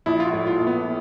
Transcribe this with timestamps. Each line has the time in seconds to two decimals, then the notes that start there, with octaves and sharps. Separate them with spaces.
0.06 A#1 E4
0.20 F4
0.27 F#4
0.33 A2
0.47 F4
0.60 A#1
0.67 B3